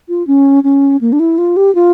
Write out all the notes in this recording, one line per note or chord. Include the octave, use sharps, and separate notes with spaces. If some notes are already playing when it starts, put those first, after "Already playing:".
F4
C#4
C#4
A#3
D4
E4
F4
G4
F4